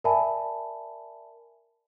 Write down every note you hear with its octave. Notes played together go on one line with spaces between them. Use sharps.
A#4 D5 E5 G#5 A5 B5